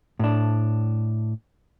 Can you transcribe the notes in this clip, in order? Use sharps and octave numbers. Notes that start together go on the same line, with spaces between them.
A2 D4